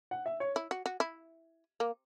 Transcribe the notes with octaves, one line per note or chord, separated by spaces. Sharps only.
F#5
E5
C#5
E4
F#4
F#4
E4
A#3